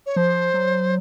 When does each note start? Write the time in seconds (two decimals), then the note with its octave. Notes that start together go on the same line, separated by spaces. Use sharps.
0.06 C#5
0.16 F3 C5
0.54 F#3